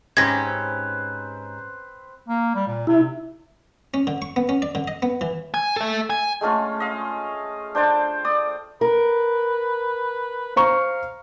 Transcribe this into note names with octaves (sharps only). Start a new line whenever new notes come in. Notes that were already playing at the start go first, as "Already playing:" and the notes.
G#2 C4 C#4 G4 B4 C5 G#6 A#6
A#3
G3
A#2
C3 E4
C#4
D3
C#6
B3
C#4
D5
D3
D#5
B3
E3
G#5
A4 E5
G#5
G#3 A3 C#4 F4
D#5 F5
D4 C5 G5 A5
D5 D#6
A#4 B4
C5 F5 A#5 C#6